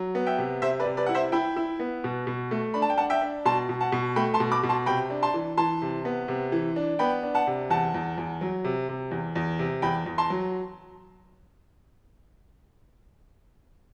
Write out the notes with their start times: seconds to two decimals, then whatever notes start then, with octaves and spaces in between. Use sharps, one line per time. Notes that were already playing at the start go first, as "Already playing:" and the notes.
Already playing: F#3
0.15 B3
0.27 E5 G5
0.38 C3
0.62 C3 C5 E5
0.80 B4 D5
0.85 C3
0.97 B4 D5
1.06 E4 F#5
1.15 C5 E5
1.32 E4 G5 B5
1.56 E4
1.79 B3
2.04 B2
2.27 B2
2.51 A3
2.74 D4 B5
2.82 A5
2.90 G5
2.97 D4 F#5 A5
3.10 E5 G5
3.22 D4
3.45 B2 A5 C6
3.69 B2
3.81 F#5 A5
3.92 B2
4.16 A3 G5 B5
4.34 A5 C6
4.40 B2
4.51 B5 D6
4.63 B2
4.69 A5 C6
4.86 C3 G5 B5
5.10 D4
5.22 A5 C6
5.34 E3
5.57 E3 A5 C6
5.82 C3
6.05 B3
6.28 C3
6.52 E3
6.76 D4
6.99 B3 G5 B5
7.23 D4
7.35 F#5 A5
7.47 C3
7.70 E2 F#5 A5
7.94 E2
8.18 E2
8.41 F#3
8.64 C3
8.89 C3
9.11 E2
9.36 E2
9.59 C3
9.82 E2 G5 B5
10.06 E2
10.18 A5 C6
10.30 F#3